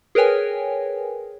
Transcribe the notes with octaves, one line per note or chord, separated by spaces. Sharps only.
G#4 A#4 B4 C#5 G5 G#5